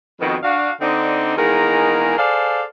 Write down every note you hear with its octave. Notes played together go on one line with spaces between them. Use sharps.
F2 B2 D#3
D4 F#4 F5
D3 C4 D4 D#4
E2 D#3 G#3 A#3 G#4 A#4
G#4 A4 C5 D5 F5